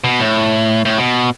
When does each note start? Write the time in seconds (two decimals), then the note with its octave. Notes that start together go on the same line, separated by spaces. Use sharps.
0.04 B2
0.20 A2
0.85 A2
0.98 B2